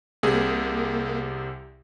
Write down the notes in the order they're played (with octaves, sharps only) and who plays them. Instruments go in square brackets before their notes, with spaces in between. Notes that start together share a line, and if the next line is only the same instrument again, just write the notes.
[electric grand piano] C2 C3 G#4 [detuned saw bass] A#3